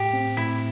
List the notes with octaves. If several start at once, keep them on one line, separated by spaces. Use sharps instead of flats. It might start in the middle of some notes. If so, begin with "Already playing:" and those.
Already playing: A2 G4
C4
A2 E4